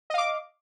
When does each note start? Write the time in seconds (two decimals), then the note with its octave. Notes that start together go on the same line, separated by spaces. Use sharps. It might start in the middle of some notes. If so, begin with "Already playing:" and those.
0.10 D#5
0.14 F5
0.18 D6